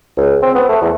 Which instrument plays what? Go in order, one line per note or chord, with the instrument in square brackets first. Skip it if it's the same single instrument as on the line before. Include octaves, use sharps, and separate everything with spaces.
[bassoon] C#2
C4
B3
A3
E2